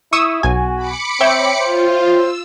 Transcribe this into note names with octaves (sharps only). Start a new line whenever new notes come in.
E4 C#6 D#6 E6
B1 F#4 G#5
B5 D6 C#7
C4 C#5 E5 G5
F4 C5
E6